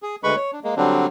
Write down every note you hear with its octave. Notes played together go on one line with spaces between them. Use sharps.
G#4
D2 G#3 B4 B5 C#6
C#5
D4
G#3 A#3
D3 F#3 G3 C4 D4